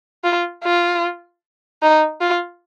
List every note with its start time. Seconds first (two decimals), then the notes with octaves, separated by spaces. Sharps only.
0.24 F4
0.64 F4
1.82 D#4
2.21 F4